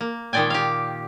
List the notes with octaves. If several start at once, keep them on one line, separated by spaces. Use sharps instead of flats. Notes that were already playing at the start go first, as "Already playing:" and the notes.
A#3
A#2 D#3 G#3 D5 G5 G#5
G4 F5